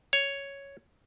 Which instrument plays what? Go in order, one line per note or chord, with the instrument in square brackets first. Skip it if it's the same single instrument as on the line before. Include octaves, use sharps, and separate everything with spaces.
[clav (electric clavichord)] C#5